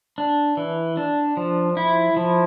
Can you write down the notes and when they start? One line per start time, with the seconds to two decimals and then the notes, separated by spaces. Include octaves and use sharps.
0.18 D4
0.57 E3
0.97 D4
1.37 F3
1.77 E4
2.17 F3